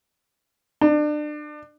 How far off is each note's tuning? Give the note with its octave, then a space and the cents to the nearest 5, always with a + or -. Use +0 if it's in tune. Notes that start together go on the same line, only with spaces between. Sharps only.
D4 +30